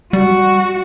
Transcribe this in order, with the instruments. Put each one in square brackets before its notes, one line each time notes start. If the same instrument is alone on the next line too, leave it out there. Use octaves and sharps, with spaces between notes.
[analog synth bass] G3 [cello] F#4